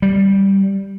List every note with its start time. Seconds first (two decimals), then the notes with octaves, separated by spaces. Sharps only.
0.02 G3